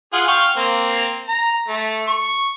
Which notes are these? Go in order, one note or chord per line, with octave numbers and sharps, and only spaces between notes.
F4 G#4 F#5
F5 G5 C#6
A#3 C4
A#5
A3
C#6